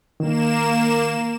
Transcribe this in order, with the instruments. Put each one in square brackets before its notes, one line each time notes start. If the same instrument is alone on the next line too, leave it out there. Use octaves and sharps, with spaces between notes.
[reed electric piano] D#3 [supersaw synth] A#3 E7